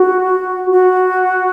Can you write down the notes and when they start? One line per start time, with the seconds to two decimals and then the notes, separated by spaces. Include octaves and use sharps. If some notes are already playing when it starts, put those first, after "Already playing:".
Already playing: F#4
0.71 F#4